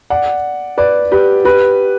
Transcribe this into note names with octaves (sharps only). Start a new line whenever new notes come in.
D5 F#5
B4 D5
G4 B4
G4 B4